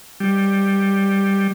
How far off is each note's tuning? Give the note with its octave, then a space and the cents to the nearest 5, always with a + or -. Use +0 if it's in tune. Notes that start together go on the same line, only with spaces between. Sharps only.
G3 +5